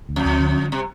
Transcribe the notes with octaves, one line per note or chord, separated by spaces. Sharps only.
D2
F2
D2
D3
G3
C3